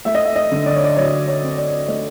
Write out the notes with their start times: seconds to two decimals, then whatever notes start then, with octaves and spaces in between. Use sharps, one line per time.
0.05 A3 E5
0.15 D#5
0.25 E5
0.36 D#5
0.52 D3
0.66 D5
0.76 C#5
0.84 D5
0.96 F#3 C#5
1.28 C#5
1.43 C4
1.58 D5
1.88 A3 D#5